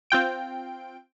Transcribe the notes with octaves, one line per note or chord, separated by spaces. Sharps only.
C4 F4 G5 D7